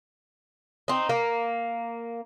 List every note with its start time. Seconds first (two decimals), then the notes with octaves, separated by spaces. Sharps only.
0.88 C4 D#4
1.09 A#3